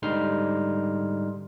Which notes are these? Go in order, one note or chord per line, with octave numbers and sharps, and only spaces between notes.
G#2 D3 G3 D#4 C6 F6